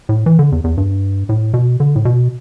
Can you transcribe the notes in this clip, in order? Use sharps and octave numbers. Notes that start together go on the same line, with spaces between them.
A2
E3
D3
E2
E2
G2
A2
B2
D3
A2
B2